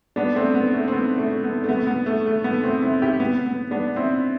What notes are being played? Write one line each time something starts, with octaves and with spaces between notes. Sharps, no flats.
B3 D4
A3 C4
B3
A3
C4
B3
A3
B3
A3
B3
B3
A3
A3
B3
A3 C4
C4 E4
E4 G4
B3
B3
B3 D4
C4 E4